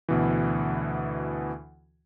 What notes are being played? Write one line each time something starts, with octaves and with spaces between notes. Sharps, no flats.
D2 B2 E3